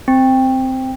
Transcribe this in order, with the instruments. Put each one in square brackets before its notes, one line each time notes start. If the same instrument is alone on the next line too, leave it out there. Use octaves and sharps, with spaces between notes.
[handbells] C4